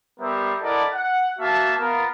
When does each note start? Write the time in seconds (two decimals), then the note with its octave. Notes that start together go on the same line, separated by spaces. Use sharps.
0.20 G3 B3 A#4 C5 E5
0.61 E4 A4 A#4 D5 D#5 F#5
0.93 F#5
1.39 A#3 F#4 E5 F5 A5
1.79 B3 F4 A#4